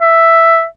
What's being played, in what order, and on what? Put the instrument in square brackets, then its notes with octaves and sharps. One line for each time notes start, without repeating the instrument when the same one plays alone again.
[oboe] E5